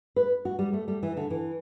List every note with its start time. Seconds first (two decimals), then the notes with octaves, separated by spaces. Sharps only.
0.16 B4
0.45 F#4
0.59 G3
0.73 A3
0.88 G3
1.03 E3
1.17 D3
1.30 E3